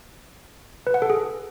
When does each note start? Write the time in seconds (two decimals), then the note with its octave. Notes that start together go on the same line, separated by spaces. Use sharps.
0.87 B4
0.94 F#5
1.02 A4
1.10 G#4